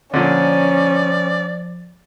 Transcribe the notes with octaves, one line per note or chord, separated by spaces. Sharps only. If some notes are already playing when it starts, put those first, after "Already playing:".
A#2 D3 F3 C#4 D5